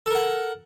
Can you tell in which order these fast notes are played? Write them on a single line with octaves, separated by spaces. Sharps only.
A4 A#4 F#5